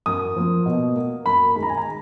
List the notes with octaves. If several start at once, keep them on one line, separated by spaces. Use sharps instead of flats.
F#2 D#6
F3 A#3
B2
A#3
F#2 B5
D#3 G#3 B5
A#5
G#5
A#5